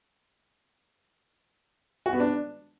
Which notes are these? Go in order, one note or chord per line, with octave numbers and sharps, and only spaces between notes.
F#4
B3
D4